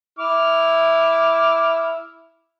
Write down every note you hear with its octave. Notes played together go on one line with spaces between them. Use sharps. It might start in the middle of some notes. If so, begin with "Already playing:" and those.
E4 D6 F6